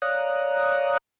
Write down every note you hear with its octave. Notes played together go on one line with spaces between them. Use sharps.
C#5 D5 F5 A#5 D#6 F#6